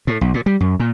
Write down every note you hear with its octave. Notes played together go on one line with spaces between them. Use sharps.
A2
B1
A#2
G3
F#2
A#2